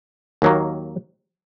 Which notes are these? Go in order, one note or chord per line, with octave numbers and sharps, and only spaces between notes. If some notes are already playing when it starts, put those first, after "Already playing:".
D#2 D#3 F#3 A#3